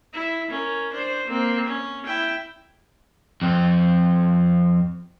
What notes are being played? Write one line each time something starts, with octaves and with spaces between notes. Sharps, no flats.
E4
C#4 A#4
D4 C5
A#3 C4
C#4
E4 G5
F2 C4